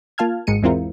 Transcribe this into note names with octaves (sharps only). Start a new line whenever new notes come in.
A#3 F4 F5 A5 F6 G#6
G#1 G#2 G#3 C#7 D#7
E2 G#3 C4 E4 F4 A#4